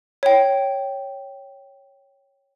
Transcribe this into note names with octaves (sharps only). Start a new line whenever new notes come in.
C#5 G5